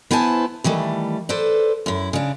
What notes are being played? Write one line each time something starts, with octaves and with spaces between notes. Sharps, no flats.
B3 E4 C5 G#5 A5
D#3 E3 G3 A3
A4 B4 C5 D5
F#2 E4
C#3 D4